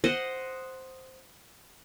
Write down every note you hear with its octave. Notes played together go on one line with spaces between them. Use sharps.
C5 D#5 F#5 C6